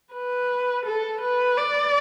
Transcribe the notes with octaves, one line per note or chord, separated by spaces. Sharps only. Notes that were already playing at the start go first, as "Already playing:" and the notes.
B4
A4
B4
D5